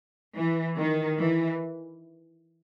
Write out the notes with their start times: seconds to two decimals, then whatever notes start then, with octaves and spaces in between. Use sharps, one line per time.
0.35 E3
0.77 D#3
1.18 E3